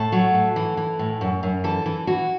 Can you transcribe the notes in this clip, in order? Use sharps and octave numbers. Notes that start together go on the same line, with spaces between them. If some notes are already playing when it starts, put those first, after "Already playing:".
Already playing: A2 A4
F#3
A2
E3
E3
A2
F#2
F#2
E3 A4
E3
E3 F#4